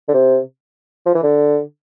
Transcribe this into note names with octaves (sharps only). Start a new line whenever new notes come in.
D3
C3
F3
E3
D3